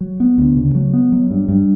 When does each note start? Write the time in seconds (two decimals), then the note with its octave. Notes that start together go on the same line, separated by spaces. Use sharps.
0.01 F#3
0.20 B3
0.38 D2
0.57 C#3
0.75 F#3
0.93 B3
1.12 F#3
1.31 G2
1.48 G2